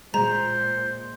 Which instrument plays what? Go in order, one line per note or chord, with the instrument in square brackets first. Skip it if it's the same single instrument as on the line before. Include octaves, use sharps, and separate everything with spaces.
[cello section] A#2 [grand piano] G#3 [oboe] C5 [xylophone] A#5